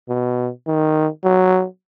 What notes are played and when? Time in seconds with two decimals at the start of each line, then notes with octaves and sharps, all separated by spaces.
0.09 B2
0.67 D#3
1.24 F#3